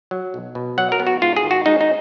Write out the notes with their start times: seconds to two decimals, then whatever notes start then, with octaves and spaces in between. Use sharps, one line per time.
0.11 F#3
0.34 B1
0.55 B2
0.78 F#3 F#5
0.92 A#4
1.00 B3
1.07 F#4
1.22 G#2 F4
1.36 G#4
1.44 D#3
1.51 F#4
1.66 G#3 D#4
1.81 D#4